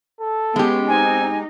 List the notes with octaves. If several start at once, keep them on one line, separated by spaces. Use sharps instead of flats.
A4
G#3 B3 C#4 G4
C4 D#4 G#5